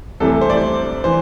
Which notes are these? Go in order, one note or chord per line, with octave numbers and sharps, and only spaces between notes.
C2 C3 E3 A3 A4
C5
D5
C5
E3 C5